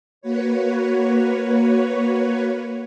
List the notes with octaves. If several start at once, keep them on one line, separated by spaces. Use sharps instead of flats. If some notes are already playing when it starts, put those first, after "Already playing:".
A#3 F#4 B4 C#5